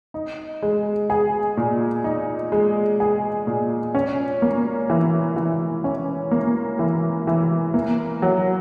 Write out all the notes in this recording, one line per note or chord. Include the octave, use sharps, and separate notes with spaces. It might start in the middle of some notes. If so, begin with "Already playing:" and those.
D#4
G#3
G#4
A#2
D#4
G#3
G#4
A#2
C#4
A#3
E3
E3
C#4
A#3
E3
E3
A#3
F#3